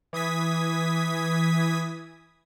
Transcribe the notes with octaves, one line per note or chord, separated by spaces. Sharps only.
E3 D#6 G#6 B6